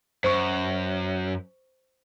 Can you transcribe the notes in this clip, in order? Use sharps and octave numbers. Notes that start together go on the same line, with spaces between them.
F#2 C5 C#6